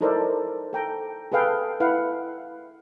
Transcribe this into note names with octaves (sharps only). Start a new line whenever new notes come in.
D#4 E4 A4 A#4 C5 D5
A4 G5 A#5
G#4 A4 B4 F5 G5
E4 B4 F5 F#5